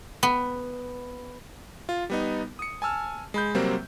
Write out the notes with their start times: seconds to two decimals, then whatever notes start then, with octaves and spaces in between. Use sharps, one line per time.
0.23 B3
1.89 F4
2.10 G3 B3 D#4
2.59 D#6 C#7
2.82 G#5 A5 E6 F6
3.34 G#3 B5 G6
3.54 C3 F#3 G3 A#3 C4